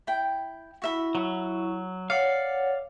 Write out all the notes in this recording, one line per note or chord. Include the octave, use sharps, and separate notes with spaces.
E4 G5
E4 F#4 E5 B5 C#6
F#3
C#5 D5 F5 F#5